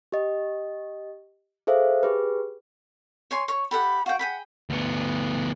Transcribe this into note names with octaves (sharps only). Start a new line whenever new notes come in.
G4 D#5
G#4 A4 C5 E5 F5
G4 G#4 B4
C#5 G#5 C6
C#5 C#6
G4 A4 F#5 B5
F#4 F5 G5
G#4 F#5 G5 B5
D2 B3